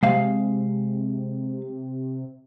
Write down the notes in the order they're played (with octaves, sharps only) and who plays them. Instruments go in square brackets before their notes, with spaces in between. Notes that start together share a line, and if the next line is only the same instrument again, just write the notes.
[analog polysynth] C3 [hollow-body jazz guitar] G#3 F5